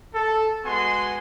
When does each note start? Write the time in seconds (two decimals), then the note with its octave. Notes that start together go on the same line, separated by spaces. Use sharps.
0.14 A4
0.65 G#3 B3 F#4 G#5 C6